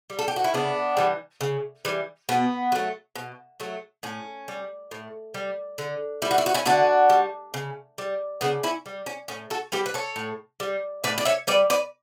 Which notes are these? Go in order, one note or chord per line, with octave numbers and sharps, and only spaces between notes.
G3
A4
G4
F#4
E4
C#3 B3 D4
E3 G3
C#3
E3 G3
B2 B3
F#3 A3
B2
F#3 A3
A2 C#4
G3
A2
G3
D3
G3 E4
F#4
E4
F#4
C#4 E4
D3 D4 F#4
G3
C#3
G3
C#3 B3 D4
C#4 E4
G3
C#4
A2 C#4
F#4 A4
G3 G4 B4
B4
A4 C#5
A2
G3
A2 B4 D5
D5
C#5 E5
G3 B4 D5
B4 D5